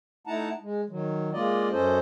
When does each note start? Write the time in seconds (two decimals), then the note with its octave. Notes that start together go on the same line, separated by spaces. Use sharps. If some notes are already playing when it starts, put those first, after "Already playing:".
0.27 A3 D#4 E4 F#5 A5 A#5
0.61 G#3
0.90 D#3 F#3
1.33 G#3 A#3 F4 D5 D#5
1.71 F#2 C#4 A4 C5 D#5